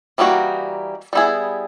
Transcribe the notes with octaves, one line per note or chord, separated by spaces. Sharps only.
E3 G3 A#3 D#4 F#4
G3 B3 E4 G#4